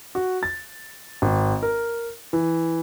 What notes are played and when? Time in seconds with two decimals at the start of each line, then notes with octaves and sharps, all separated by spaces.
0.15 F#4
0.43 A6
1.22 G#1
1.63 A#4
2.33 E3